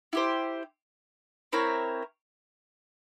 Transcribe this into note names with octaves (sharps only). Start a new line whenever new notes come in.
E4 G4 C5
C4 E4 A#4 C#5